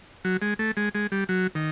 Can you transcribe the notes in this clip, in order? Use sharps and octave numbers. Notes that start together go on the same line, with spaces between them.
F#3
G#3
A3
G#3
G#3
G3
F#3
D#3